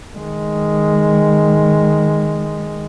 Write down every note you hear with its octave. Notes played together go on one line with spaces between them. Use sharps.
D#3 G#3